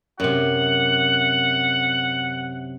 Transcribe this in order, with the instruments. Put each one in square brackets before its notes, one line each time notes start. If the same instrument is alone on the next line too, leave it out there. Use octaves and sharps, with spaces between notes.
[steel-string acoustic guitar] F#2 C3 [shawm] F#5